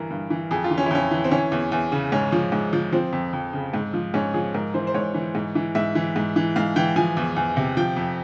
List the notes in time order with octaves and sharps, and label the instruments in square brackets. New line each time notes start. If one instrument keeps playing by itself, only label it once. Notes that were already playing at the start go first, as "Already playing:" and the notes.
Already playing: [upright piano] G2 E3 A#4
G2
E3
F2 G#4
F4
E3
C#4
E4
F2 C#4
E3
C4
E3 C#4
E2
E2
C#3
G#2 C#4
F3
G#2
F3
F3 C4
F2
F2
C#3
G#2
F3
G#2 C#4
F3 G#4
G#2 A#4
E3 C5
C5
G#2 C#5
E3
G#2
E3
G#2 E5
E3
G#2
E3
G#2 F5
E3 G5
F3 G#5
E2
E2
C3
F3 G5
F2